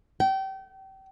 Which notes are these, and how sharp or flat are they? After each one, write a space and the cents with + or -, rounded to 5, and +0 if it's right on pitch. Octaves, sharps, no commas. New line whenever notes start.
G5 -30